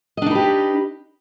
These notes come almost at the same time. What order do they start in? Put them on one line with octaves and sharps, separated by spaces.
D#5 D4 D#4 B4 G4